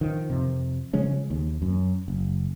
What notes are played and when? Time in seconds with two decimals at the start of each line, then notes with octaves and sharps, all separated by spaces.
0.01 D#3 F3
0.30 F2 C3
0.93 C#3 F3 G#3 C#4
1.30 D#2
1.62 F#2
2.08 F#1